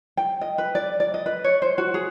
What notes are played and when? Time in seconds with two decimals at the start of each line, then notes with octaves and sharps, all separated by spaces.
0.17 G5
0.41 D#5
0.58 B4
0.75 D5
1.00 D5
1.14 D#5
1.26 B4
1.44 C#5
1.62 C5
1.78 F#4
1.94 G#4